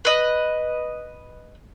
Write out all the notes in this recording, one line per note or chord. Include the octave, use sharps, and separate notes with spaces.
B4 D#5